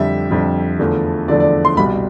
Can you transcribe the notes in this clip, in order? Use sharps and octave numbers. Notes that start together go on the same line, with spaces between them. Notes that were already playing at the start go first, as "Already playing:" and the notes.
Already playing: F2 D3 G3 E5
F2 D3 G3
E2 D3 F3 A3
E2 D3 F3 A3 D5
D5
C6
C2 B2 G3 B5